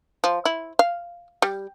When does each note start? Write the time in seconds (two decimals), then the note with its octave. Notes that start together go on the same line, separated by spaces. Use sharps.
0.24 F3
0.45 E4
0.79 F5
1.42 G3